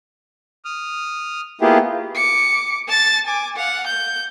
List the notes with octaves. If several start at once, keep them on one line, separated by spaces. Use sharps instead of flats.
D#6 F6
A#3 B3 E4 F4 G4 G#4
D6 C#7
A5 A6
G#5 D6
F5 F#5
G6